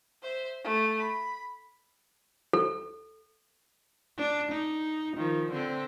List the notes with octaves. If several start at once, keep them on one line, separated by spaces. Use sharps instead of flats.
C5 E5
A3
B5
A4
D4
D#4
D#3 F3
D3 C4